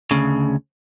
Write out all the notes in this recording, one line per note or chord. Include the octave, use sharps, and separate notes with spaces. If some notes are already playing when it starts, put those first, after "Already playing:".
D2 C#3